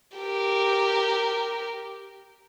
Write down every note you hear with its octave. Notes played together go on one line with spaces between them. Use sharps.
G4 A#4